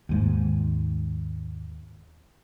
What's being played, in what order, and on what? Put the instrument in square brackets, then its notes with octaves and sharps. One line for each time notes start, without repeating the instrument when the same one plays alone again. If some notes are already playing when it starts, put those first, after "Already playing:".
[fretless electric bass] D#2 G#2